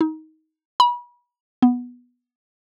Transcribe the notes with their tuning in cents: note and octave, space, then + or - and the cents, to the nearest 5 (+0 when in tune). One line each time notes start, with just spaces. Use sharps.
D#4 +20
B5 -35
B3 -10